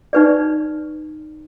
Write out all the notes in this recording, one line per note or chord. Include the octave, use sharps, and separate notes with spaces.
D#4 B4 D5